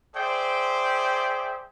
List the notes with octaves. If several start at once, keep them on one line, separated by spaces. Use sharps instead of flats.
G#4 C5 D5 E5 G5